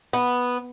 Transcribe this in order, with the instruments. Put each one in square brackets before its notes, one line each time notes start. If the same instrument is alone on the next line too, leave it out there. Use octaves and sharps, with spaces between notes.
[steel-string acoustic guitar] B3